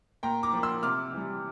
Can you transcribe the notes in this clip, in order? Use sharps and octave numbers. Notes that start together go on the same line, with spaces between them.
A#2 G5 A#5
A#5 D6
F3 A#3
C6 E6
C3 D6 F6
E3 G3